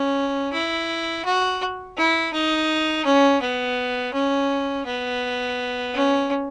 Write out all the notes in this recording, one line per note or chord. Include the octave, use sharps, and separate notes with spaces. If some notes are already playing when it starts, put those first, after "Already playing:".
Already playing: C#4
E4
F#4
E4
D#4
C#4
B3
C#4
B3
C#4